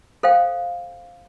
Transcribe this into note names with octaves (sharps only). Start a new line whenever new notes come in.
A4 C5 F5 G5